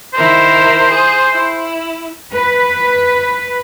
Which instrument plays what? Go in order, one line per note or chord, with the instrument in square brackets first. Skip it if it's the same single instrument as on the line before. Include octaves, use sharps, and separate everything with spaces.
[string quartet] D#3 E4 A#4 [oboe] C5
[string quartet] G#4
E4
[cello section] B4